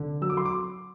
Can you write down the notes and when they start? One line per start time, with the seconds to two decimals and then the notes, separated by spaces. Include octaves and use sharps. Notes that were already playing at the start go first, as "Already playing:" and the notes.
Already playing: D3
0.21 F#3 E6
0.30 D6
0.37 C6
0.45 D6